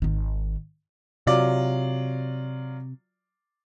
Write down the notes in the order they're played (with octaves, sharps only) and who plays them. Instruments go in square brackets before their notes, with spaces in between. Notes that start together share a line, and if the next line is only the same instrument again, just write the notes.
[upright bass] G#1 D#3
[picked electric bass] C3 [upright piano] F#3 F4 D5